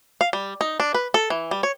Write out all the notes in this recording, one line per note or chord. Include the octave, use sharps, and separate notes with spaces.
F5
G3
D#4
D4
B4
A4
E3
G3
C#5